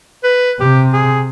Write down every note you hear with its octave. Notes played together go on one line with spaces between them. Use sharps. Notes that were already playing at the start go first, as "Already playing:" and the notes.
B4
C3 G4
G#4